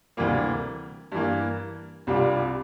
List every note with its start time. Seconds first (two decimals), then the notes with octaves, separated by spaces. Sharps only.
0.17 D2 C3 E3 G3 A#3
1.12 G2 E3 A#3
2.07 C2 C3 G3 D4 F4